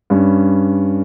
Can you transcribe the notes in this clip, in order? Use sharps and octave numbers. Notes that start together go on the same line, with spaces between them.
G2 G3 C#4